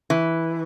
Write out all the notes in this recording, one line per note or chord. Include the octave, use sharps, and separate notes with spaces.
E3